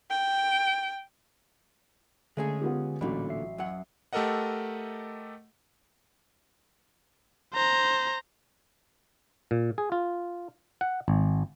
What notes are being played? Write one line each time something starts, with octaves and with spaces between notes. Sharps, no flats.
G5
D3 G#3 A3 C#4 G#4
B3 F4 G4
A1 A#2 D3 F#3 B5
E5 C7
F#2 F#5
A3 G4 A4 A#4 D#5 F#5
C5 A#5
A#2
G#4
F4
F#5
G#1